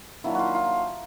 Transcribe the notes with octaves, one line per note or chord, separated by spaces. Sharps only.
D#3 F#3 A#3 D4 E4
F4 F#4
F4